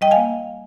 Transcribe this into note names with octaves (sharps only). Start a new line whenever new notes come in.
G3 D#5 G5
F5 G#5
A#3